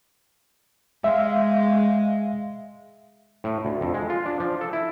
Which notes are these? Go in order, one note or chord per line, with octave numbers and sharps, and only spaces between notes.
G#3 E5 F5
A2
D2
F2
G#3
F4
D4
F3
A4
E4